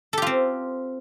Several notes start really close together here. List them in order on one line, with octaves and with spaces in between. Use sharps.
A4 G4 F4 C4